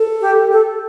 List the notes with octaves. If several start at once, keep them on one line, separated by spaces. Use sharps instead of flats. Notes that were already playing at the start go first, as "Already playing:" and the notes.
Already playing: A4
G4
A4